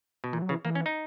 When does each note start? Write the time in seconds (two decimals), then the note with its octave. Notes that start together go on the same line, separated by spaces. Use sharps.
0.24 B2
0.33 A#2 E3
0.42 F#3
0.49 C#3 E3
0.65 E3 A#3
0.75 C#4
0.86 D#4